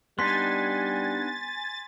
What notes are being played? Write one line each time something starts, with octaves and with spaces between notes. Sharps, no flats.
G3 B3 D4 D#4 G#5 C6 A6 B6